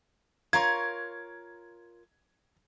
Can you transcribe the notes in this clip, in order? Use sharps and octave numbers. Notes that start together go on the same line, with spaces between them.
F4 A#4 C#5 G#6